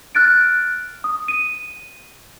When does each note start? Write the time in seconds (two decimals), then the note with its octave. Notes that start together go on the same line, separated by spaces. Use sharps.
0.15 F6 F#6 A6 D7
1.04 D#6
1.28 D#7